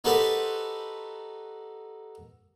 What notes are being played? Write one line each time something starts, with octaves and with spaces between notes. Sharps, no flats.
D#4 F#4 G4 A4 B4 C5